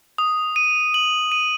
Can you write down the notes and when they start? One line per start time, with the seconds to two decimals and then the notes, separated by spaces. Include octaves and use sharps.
0.18 D#6
0.56 D#7
0.94 F#7
1.32 D#7